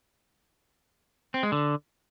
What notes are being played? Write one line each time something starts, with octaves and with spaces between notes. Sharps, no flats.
C4
G#3
D3